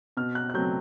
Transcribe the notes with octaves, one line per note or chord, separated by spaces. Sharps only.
B2 F6
F#6
F#6
F#3 A3 C4 G6